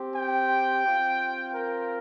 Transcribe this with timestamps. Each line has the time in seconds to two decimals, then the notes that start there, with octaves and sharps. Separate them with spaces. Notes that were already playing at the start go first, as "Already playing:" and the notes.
Already playing: C4 G4
0.14 G5
0.85 C4 F4
1.55 A#4